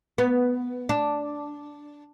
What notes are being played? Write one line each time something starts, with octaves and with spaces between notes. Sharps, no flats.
B3
D4